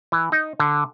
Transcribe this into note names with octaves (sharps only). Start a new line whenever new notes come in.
E3
D#4
D3